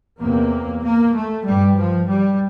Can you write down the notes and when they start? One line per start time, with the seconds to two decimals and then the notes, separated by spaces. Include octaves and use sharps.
0.21 E2 C3 A#3
0.83 A#3
1.15 A3
1.46 G2 G3
1.78 F3
2.09 G3